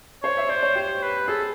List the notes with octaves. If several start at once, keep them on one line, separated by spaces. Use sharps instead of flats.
C5 C#5
E5
C5 D5
C#5
G4 C5
B4
G#4 A4